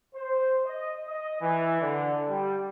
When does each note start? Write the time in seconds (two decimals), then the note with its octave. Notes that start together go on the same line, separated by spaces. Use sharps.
0.15 C5
0.65 D#5
1.06 D#5
1.41 E3
1.80 D3
2.27 G3